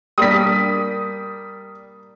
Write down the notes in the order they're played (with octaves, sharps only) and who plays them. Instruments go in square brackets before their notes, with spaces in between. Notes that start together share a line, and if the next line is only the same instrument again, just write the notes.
[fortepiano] G3 A#3 D4 [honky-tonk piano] D#6 B6